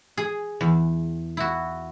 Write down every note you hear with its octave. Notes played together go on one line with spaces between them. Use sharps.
G#4
E2
E4 F#4